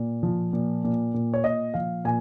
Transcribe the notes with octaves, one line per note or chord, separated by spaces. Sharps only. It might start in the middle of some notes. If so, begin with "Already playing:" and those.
Already playing: A#2
F3
A#2
A#2
A#2
C#5
A#2 D#5
F3 F5
A#2 G#5